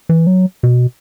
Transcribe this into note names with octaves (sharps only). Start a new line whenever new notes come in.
E3
F#3
B2